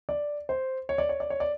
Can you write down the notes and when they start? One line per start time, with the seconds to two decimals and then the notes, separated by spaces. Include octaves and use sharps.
0.09 D5
0.49 C5
0.89 C#5
0.98 D5
1.09 C#5
1.20 D5
1.30 C#5
1.40 D5